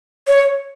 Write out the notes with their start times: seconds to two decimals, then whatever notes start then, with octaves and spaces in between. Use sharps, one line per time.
0.28 C#5